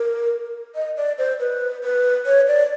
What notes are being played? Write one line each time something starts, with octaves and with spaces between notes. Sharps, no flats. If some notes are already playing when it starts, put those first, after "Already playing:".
Already playing: A#4
D#5
D5
C5
B4
B4
C#5
D5